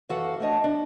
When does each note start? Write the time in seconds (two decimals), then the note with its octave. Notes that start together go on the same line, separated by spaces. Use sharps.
0.09 F#2 E3 F#4 A4 F5 F#5
0.40 A3 D4 C#5 D#5 A5
0.64 D4